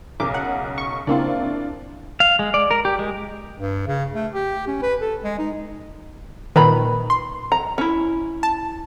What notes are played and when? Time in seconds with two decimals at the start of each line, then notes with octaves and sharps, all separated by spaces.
0.20 B1 C#3 A#4 D6
0.34 F#5
0.78 C#6
1.07 C#3 A#3 C4 D4 E4 F4
2.20 F5
2.39 G#3
2.54 D5
2.71 A#4
2.85 G4
2.99 G#3
3.58 G2
3.87 C#3
4.14 A3
4.34 G4
4.67 C#4
4.82 B4
5.01 A4
5.24 G#3
5.39 D#4
6.56 A#2 D#3 B4 A#5 B5
7.10 C6
7.52 A#5
7.78 C#4 E4
8.43 A5